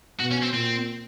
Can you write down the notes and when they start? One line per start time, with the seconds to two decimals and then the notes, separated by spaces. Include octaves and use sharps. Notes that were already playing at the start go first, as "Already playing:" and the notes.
0.20 B2 F#4
0.31 C#4
0.43 C4
0.54 A#2 C4